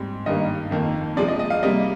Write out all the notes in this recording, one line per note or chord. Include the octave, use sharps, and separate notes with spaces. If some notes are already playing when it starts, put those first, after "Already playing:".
Already playing: G#2 G3 C4
G2 D#3 G3 A#3 D#5
F2 D#3 A#3
C3 F3 G#3 D5
D#5
D#5
F5
C3 G3 A#3 D#5